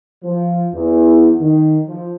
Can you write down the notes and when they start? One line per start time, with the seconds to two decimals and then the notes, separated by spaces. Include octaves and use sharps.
0.23 F3
0.73 E2
1.40 D#3
1.86 F3